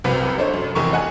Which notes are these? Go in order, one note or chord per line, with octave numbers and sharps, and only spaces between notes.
C2 F#2 C3 C4 B4 B6
D4 A4 C5 C#5 D#5
F#2
F1 E2 C#6
D#5 F#5 G#5